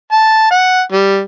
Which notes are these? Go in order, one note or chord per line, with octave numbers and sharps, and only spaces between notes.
A5
F#5
G3